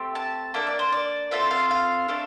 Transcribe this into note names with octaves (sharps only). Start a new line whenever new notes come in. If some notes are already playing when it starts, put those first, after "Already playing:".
Already playing: A3 C4 G4
A5
A#3 D4 A4 E5
D5
C5
D5
C4 F4 A4 E5
F5
F5
A3 D4 A4